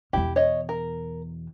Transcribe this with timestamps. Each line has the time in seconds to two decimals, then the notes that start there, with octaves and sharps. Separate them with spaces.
0.13 E2 B2 E4 G4
0.36 C#5 D#5
0.69 A#4